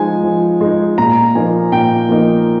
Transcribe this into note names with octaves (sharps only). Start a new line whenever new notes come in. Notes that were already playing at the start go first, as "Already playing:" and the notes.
Already playing: F3 G#3 D#4 G#5
F3
G#3 D#4
A#2 A#5
F3 A#3 D#4 G#5
A#2 G5
F3 A#3 D#4